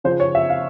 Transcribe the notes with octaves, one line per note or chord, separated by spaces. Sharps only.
C#3 F3 C5
C#5
E5
F5